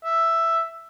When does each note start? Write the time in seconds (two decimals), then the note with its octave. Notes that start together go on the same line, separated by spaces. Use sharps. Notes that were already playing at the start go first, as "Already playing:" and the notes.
0.04 E5